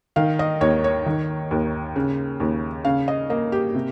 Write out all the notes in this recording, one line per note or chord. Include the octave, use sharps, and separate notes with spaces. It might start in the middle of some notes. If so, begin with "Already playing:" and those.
D#3 F5
D#5
D#2 C#5
C#5
D#3
D#2
C#3
D#2
C#3 F5
D#5
A#3 D#5
G4
C3